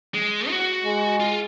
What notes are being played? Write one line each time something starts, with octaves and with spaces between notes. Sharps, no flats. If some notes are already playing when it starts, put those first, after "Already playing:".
G#3
F#4
G#3
F4